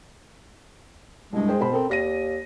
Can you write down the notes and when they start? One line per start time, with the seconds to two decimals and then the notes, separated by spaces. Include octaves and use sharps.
1.32 C2 G2 G#3
1.48 G#4 C5 G5
1.61 B2 C5 B5
1.73 C4 A4 A#4
1.89 D#2 D5 A#6 D#7